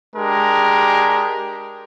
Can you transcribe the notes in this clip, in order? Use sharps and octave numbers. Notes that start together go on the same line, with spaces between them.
G#3 D4 G4 A#4